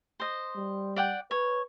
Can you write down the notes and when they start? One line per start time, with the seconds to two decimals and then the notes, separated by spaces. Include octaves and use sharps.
0.20 C5 D#5
0.56 G3
0.96 D5 F#5 G5
1.31 B4 C#5